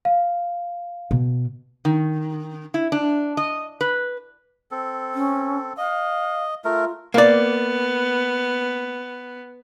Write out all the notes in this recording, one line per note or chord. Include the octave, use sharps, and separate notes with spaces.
F5
B2
D#3
E4
D4
D#5
B4
C4 A4
C#4
D#5 F5
A3 F4 A#4
A#3 B3 D5